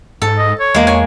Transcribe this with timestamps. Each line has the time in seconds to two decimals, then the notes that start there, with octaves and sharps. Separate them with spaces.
0.22 G#2 A4
0.38 D#5
0.60 C#5
0.74 E2 G#3 A#3
0.87 C#5 G#5